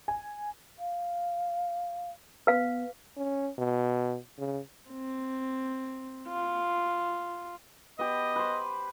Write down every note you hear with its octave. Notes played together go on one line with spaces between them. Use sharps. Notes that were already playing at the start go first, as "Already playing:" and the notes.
G#5
F5
B3 B4 F5
C#4
B2
C#3
C4
F4
B3 G4 D#5
B4 C5